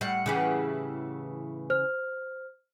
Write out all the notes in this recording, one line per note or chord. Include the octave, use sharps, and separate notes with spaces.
A2 G3 F#5
C#3 E3 G4
C5 F6